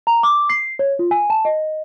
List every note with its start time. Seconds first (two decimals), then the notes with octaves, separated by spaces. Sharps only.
0.07 A#5
0.23 D6
0.50 C7
0.79 C#5
0.99 F4
1.11 G#5
1.30 A5
1.45 D#5